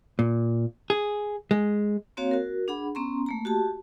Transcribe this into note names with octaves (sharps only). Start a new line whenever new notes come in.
A#2
G#4
G#3
A#3 C4 F#4 C#5 F5
F#4 A#4
D4 G#4 F#5 B5
B3 C#4 A#5 C6
A3 A#3 A#5
F#4 G4 A5